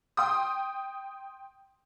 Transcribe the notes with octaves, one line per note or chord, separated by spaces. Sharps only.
G5 C6 D#6